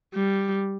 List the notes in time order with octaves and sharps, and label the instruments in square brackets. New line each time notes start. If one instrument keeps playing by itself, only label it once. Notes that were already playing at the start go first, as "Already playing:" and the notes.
[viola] G3